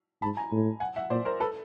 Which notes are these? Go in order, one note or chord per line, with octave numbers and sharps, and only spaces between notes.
G#2 A5 B5
G#5 A#5
A2
F#5 G#5
E5 F#5
A#2 C5 D5
A#4 C5
A4 B4